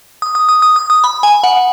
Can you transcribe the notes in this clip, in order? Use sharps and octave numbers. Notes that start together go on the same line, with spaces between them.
D#6
D#6
D#6
D#6
D#6
D#6
B5
G#5
F#5